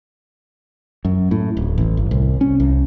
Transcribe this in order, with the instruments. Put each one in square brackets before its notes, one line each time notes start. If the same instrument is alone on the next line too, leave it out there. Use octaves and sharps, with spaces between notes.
[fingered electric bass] F#2
A2
D1
A1
G1
C2
C#4
C2